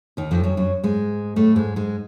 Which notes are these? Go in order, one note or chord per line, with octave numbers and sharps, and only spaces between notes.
D#2 D#3
F2 F3
F#2 F#3
F#2 F#3
G#2 G#3
A2 A3
G#2 G#3
G#2 G#3